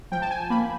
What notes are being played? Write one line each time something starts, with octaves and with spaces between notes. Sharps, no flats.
F3 G5
A5
G#5
A#3 B5